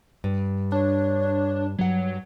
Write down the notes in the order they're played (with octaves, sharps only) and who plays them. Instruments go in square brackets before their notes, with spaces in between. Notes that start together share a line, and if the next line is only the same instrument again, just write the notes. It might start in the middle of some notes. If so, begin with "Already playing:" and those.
[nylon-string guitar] G2
[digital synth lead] D4 [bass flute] C#5
[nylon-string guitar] G2 F#5 [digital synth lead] F#3